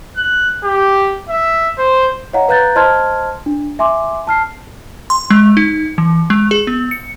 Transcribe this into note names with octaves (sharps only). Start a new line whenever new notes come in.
F#6
G4
E5
C5
C#5 D#5 F5 F#5 A#5
B4 F5 A#5 F#6 G6 A6
C5 D#5 A5 C6 F6 G#6
D4
E5 G#5 C6 D6
A5 F6 C7
C6
G#3
D#4
E3
G#3
G#4
B3
C#7